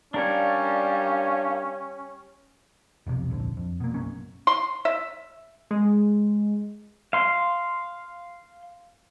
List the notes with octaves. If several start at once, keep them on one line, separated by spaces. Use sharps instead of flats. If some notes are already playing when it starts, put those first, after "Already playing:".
G3 C#4 D4 A#4 C#5 F5
F1 B1 F2 C3
D1 A#1 F2 D3
F2
B2 A#3
F#1 B1 A#3 C#4
C6
E5
G#3
F5 C6